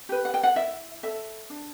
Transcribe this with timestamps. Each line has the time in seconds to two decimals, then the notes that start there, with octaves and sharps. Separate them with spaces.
0.09 G4 B4
0.25 F#5
0.34 G5
0.43 F#5
0.56 E4 E5
1.03 A4 E5
1.50 D4